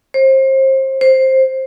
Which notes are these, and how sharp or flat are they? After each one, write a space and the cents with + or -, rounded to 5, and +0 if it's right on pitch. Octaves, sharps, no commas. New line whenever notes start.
C5 +30
C5 +10